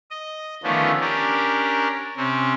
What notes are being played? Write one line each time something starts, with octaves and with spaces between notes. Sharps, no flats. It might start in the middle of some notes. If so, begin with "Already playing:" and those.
D#5
D3 D#3 F3 A3 B3 C#4
C#4 D4 G4 A#4
C3 C4 C#4